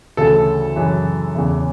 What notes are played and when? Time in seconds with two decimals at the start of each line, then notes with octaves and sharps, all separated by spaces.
0.17 D2 C#3 E3 A4
0.76 F#2 C#3 E3
1.35 E2 C#3 E3